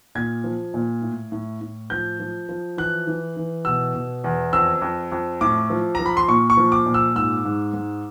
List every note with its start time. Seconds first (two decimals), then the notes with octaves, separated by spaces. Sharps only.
0.15 A#2 G#6
0.44 F3
0.74 A#2
1.02 A2
1.32 A2
1.61 A2
1.90 F3 G6
2.20 F3
2.49 F3
2.77 E3 F#6
3.07 E3
3.37 E3
3.65 B2 E6
3.95 B2
4.24 E2
4.53 F2 E6
4.82 F2
5.12 F2
5.41 A2 D6
5.70 F3
5.95 F3 A#5
6.06 B5
6.17 C6
6.29 A#2 C#6
6.50 C#6
6.57 F3
6.72 D6
6.86 A#2
6.94 E6
7.15 G#2 E6
7.45 G#2
7.74 G#2